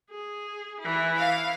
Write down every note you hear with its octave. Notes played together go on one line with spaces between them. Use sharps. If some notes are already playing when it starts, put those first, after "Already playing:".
G#4
E3 E4
F5